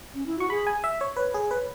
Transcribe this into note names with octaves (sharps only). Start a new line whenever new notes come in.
C#4
E4
F#4 C#6
G#4 B5
G#5
E5
C#5
B4 C#5
G#4
B4